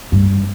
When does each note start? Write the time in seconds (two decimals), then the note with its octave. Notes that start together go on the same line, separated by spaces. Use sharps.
0.12 G2